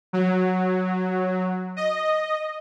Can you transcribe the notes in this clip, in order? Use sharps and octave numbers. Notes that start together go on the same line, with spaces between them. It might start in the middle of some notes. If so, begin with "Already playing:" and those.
F#3
D#5